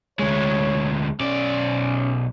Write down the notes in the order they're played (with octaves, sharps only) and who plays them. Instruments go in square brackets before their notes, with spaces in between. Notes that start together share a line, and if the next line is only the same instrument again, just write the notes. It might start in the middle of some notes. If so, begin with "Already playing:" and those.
[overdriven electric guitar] D2 G#3 [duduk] C#5
[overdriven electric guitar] B1 D5 [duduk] C#4